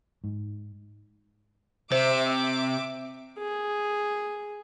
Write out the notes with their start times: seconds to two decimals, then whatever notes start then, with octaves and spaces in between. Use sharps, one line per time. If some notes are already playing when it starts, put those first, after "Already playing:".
0.24 G#2
1.92 C3 C5 E5 D6
2.29 E5 D6
3.39 G#4